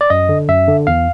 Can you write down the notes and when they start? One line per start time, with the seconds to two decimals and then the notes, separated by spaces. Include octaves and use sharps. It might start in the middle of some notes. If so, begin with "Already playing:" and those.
0.01 D5
0.10 F#2 D#5
0.29 D3
0.49 F#2 E5
0.68 D3
0.87 E2 F5